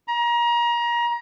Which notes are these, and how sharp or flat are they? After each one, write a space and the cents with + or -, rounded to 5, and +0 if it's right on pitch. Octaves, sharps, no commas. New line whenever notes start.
A#5 +30